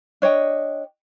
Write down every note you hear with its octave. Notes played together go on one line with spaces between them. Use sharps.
D4 C#5 D#5 G5